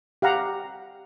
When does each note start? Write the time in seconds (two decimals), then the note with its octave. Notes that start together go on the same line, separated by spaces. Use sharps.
0.22 G4 F5 F#5 A#5